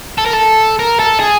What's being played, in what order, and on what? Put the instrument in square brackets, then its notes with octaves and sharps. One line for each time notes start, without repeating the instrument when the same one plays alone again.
[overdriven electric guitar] A4
A#4
A4
A#4
A4
G#4